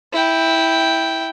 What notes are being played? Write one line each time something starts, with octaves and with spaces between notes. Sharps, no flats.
E4 G5